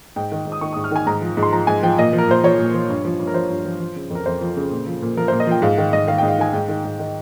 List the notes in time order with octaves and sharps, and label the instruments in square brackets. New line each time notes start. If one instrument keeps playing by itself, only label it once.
[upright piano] G#2 G5
D#3
G#2
D#6
D#3 C#6
G#2 D#6
F6
D#3 G#5
G#2 A#5
F3
G#2
C6
F3 A#5
G#2 G#5
F3 G5
A#2 D#5
F3
A#4
A#2 C5
F3 C#5
A#2
F3
G2
F3
G2
A#4
F3 C5
G2
F3
F3
C#3
F2
A#4
F2 C5
F3
C#3
A#2
F3
A#2
F3 A#4
A#2 C5
D#5
F3 G5
G#2 F5
D#3 F5
G#2 D#5
D#3 F5
G#2 G5
F5
D#3 G#5
G#2 G5
D#3
G#2
D#3